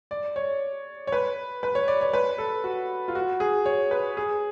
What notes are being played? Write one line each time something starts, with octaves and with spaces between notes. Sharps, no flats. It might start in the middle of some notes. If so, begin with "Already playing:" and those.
D5
C#5
C#5
B4
B4
C#5
D5
C#5
B4
A4
F#4
F4
F#4
G#4
C#5
B4
G#4